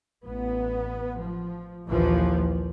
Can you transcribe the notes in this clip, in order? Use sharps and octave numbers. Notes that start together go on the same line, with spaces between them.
A1 B3
F3
A#1 D#2 E3 F3